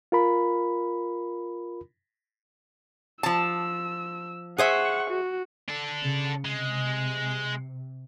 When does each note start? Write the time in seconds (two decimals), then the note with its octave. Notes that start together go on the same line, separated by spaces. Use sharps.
0.12 F4 A#4 B5
3.23 F3 A5 E6
4.58 G#4 C5 E5 F#5 C#6
5.10 F#4
5.69 D4 A4
6.03 C#3
6.45 C3 G#3